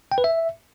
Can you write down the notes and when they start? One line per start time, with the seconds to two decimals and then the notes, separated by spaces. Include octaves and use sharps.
0.12 G5
0.18 B4
0.24 E5